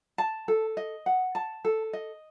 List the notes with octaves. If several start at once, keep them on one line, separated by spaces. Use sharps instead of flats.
A5
A4
D#5
F#5
A5
A4
D#5